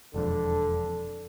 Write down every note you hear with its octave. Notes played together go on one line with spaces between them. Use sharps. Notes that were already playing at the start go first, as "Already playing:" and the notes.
E1 F2 D3